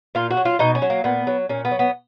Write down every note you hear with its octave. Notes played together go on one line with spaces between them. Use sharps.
A#2 F4
F#4
F#3
F4
B2 D#4
C#4
F#3
A#3
A#2 B3
F#3
A#2 C#4
B3
F#3
B3